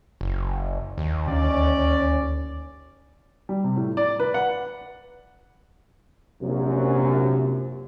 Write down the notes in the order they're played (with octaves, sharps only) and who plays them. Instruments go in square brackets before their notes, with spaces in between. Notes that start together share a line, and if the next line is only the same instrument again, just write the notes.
[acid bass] F#1
D#2
[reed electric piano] D2 [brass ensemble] C#4 D5
[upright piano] G3
C3
A2
D5
B4
F#5
[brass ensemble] A#1 F#2 [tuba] C3